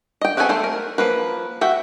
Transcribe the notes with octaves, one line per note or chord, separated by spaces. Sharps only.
D#5 G5
B3 C4 F#4 A4 G#5
A3 C5
A#4
F3 A#3 B4
F#4 E5 G5